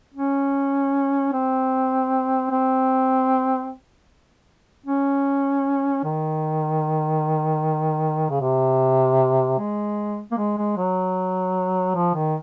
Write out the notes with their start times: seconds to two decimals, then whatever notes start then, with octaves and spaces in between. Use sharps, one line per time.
0.14 C#4
1.33 C4
2.50 C4
4.86 C#4
6.04 D#3
8.30 C#3
8.41 C3
9.58 G#3
10.31 A#3
10.37 G#3
10.57 G#3
10.77 F#3
11.95 F3
12.14 D#3